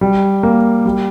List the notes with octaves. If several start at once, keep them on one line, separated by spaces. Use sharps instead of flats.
G3
A#3
G3